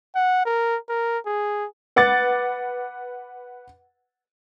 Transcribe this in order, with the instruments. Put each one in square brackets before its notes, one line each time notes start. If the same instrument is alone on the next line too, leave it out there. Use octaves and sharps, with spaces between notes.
[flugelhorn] F#5
A#4
A#4
G#4
[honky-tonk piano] B4 F#5 D6 A6